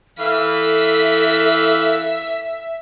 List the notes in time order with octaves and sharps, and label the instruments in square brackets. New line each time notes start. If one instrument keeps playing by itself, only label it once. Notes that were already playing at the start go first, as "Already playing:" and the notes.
[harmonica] E3 F5 [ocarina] A4 [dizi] E5 [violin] B6